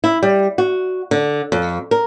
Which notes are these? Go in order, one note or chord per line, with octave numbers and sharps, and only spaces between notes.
E4
G3
F#4
D3
F2
A#4